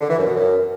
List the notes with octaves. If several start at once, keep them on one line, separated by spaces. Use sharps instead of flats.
D3
E3
F#2
B2
F#2